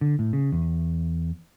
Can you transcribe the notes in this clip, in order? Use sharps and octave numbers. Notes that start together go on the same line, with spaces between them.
D3
A2
C#3
E2